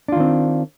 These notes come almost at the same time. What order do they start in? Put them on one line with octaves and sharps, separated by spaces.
D4 F4 D#3 C4